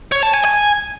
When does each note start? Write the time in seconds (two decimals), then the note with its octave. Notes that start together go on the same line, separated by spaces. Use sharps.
0.12 C#5
0.23 A5
0.34 G#5
0.45 G#5